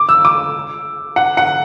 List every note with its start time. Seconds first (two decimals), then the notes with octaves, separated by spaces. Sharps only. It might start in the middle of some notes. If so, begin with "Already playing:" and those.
Already playing: D6
0.09 E6
0.25 D6
1.16 F#5
1.37 F#5